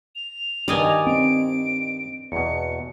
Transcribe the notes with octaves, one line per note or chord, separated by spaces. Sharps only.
F7
G2 D#3 G3 D5 D#5 G#5
C4 D7
E2 B2 C#7